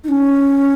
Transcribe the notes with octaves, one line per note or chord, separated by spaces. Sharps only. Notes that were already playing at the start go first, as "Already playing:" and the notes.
D#4
C#4